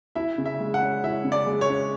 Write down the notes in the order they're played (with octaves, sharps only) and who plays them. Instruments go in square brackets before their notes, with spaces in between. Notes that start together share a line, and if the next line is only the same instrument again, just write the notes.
[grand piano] E4 [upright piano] E5
[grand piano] C#3
[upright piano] E5
[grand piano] G#3
[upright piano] F#5
[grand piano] C#4
[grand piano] E4 [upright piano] E5
[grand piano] C#3
[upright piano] D5
[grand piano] G#3
[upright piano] C#5
[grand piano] C#4